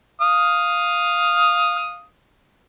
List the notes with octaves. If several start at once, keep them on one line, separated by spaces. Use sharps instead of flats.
F5 D#6